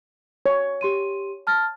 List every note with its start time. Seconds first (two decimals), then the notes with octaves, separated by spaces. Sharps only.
0.46 C#5
0.81 G4 C6 D#7
1.47 A5 F6 A6